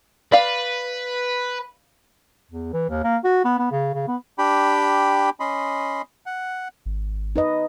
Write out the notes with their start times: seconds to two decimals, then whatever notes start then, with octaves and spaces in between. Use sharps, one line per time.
0.32 B4 D5 F5
2.51 E2
2.73 E3
2.90 D#2
3.04 A#3
3.24 F#4
3.45 B3
3.58 B3
3.71 C#3
3.94 C#3
4.07 B3
4.38 D4 G4 G5 B5
5.40 C#4 D#5 B5 C6
6.26 F#5
6.86 G#1
7.36 D#4 B4 D#5